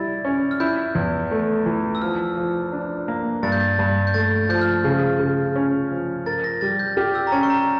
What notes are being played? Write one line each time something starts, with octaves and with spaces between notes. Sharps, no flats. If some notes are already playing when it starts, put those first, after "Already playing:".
Already playing: G3 E4 A6
C#4
F6
E4 G6
E2
A3
E3
E6
F3 F6
F3
D4
A#3
G2 A6
G6
A6
G2
G6
A3 A6
F3 G6
F6
C#3
C#3
C#4
F3
A#4 A6
A#6
G3 A6
G6
G4 F6
E6
A#5
C#4 A5
C#6
A#5